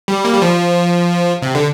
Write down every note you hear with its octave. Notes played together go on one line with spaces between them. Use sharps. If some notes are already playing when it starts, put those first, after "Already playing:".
G3
A#3
G3
F3
C3
D3